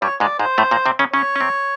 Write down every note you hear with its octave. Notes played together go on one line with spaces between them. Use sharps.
G2 G3 C#5
G#2 G#3 D5
G#2 G#3 C5
A2 A3
A#2 A#3
C3 C4
C#3 C#4
C#3 C#4 C#5
C#4
C3 C4